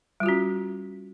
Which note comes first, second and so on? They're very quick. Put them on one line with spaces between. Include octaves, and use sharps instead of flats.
G3 F4 F#4 C#4